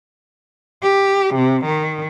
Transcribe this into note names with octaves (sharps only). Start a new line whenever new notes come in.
G4
C3
D#3